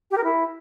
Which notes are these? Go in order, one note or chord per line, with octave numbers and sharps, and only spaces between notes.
G4
A#4
E4